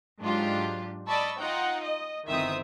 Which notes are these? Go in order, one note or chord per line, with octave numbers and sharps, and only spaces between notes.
G#2 F#3 D4 F4 G4
D5 D#5 A5 B5 C#6 E6
D#4 F4 F#5 G5
D#5
G1 D#3 E3 C4 E5 D#6